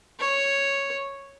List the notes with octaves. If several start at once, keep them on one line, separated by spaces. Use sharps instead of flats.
C#5